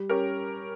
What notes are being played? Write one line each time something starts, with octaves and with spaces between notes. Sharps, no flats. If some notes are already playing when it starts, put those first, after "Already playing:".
Already playing: G3
C#4 G4 A#4